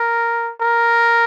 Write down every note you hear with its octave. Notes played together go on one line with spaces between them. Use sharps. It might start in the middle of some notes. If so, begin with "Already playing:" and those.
Already playing: A#4
A#4